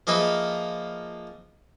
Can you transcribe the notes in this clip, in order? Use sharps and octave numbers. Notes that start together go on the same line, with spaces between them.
F3 A#3 D#4 G#4 B4 E5